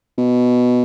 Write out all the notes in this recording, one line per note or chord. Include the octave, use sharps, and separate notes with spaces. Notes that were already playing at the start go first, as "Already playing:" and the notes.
B2